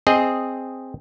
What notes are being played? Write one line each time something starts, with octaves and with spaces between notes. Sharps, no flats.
C4 G#4 D#5